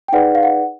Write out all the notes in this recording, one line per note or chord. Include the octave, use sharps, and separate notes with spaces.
G5
D#4 G#4 B4 D5 F#5
F5
F#5